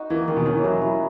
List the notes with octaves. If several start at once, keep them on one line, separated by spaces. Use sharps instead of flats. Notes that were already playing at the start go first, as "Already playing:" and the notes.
Already playing: D#4 F#4
E3 A#3
D#3 G#4
B2
D#3 C#4
E3
F#3 E4
F#3 E4